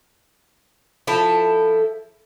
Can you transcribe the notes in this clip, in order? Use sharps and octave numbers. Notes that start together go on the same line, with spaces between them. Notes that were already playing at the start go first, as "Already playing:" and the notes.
F3 E4 A4